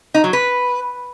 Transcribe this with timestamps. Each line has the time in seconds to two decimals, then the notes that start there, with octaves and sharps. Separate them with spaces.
0.14 D#4
0.24 F#3
0.33 B4